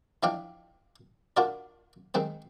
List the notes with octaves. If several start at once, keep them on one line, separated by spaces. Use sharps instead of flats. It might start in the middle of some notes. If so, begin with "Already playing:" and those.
E3 F3 D4 D#5 F5 G5
D4 F4 F#4 A#4 D5
D#3 G#3 C4 C5